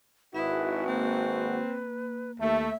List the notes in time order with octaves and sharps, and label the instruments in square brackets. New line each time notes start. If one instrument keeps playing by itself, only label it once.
[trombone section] G#1 F#4 [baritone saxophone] E4 [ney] B4 [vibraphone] E5 D#6
[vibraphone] A#3 [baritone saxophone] C4
[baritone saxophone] D#2 [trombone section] A3 [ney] E5